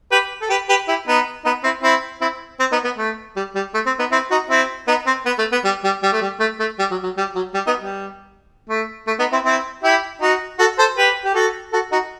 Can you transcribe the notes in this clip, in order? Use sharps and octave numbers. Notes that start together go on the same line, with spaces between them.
G4 B4
A4
G4 B4
G4 B4
E4 G4
B3 D#4
B3 D#4
C4 E4
C4 E4
C4 E4
C4
B3 D#4
B3
A3
G3
G3
A3
C4
B3 D#4
C4 E4
D#4 F#4
C4 E4
B3 D#4
C4
B3
A3
B3
G3
G3
G3
A3
G3
A3
A3
G3
F#3
F#3
G3
F#3
G3
B3 D#4
G3
A3
A3
B3 D#4
C4 E4
C4 E4
E4 G4
D#4 F#4
F#4 A4
A4 C5
G4 B4
G4
F#4 A4
F#4 A4
D#4 F#4